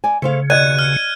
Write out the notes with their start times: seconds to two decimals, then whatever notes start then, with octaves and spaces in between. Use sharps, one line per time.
0.04 D5 G#5
0.22 C#3 A3 C5 F5
0.50 D#2 B2 D5 D#5 F#6 G#6 D#7
0.79 F6